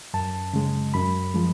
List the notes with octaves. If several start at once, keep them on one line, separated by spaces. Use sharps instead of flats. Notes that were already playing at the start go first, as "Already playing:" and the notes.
F#2 A5
C#3 G#3
F#2 B5
F3 G#3